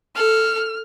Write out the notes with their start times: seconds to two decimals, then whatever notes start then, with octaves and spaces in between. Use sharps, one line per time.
0.16 A4 F6